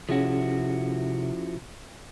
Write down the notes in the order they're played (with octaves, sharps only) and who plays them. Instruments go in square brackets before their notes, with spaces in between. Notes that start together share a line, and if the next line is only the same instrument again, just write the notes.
[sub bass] C3 [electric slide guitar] F3 E4 F#4 [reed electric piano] C#4 G#4